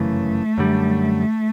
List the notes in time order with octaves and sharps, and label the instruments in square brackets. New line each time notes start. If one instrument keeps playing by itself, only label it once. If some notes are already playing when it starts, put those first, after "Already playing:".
Already playing: [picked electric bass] G1 F#2 C#3 E3 [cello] A3
[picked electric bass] F#2 D3 G3